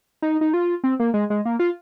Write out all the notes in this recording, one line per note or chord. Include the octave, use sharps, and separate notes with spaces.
D#4
D#4
F4
C4
A#3
G#3
G#3
A#3
F4